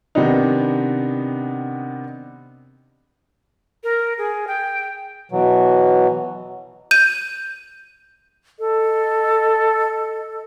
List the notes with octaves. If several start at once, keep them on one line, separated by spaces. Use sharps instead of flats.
C3 D#3 B3 D4 D#4
A#4
G#4
G5
B2 E3 F#3
G6 D#7
A4 D#5